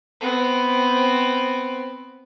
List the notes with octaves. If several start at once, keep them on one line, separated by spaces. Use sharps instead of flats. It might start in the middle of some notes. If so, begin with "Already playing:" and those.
B3 C4